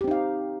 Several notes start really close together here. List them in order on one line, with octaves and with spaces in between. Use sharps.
G4 C4 D#4 F5